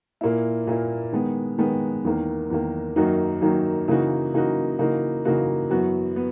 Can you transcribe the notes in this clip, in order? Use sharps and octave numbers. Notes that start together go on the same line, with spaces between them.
A#2 A#3 E4
A#2 A#3 E4
D#3 G#3 B3
D#3 G#3 B3
E2 D#3 A#3
E2 D#3 A#3
F#2 D#3 A#3 D#4 F#4
F#2 D#3 A#3 D#4 F#4
C#3 E3 A#3 D#4 F#4
C#3 E3 A#3 D#4 F#4
C#3 E3 A#3 D#4 F#4
C#3 E3 A#3 D#4 F#4
F#2 E3 B3 F#4
B3